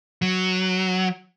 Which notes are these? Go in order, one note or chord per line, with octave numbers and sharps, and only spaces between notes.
F#3